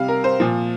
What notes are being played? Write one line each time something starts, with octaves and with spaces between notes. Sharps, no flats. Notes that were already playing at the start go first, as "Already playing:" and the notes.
Already playing: C3 G3 F5
A#4
C5
A#2 F3